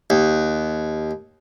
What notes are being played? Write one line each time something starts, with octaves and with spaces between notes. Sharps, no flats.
D#2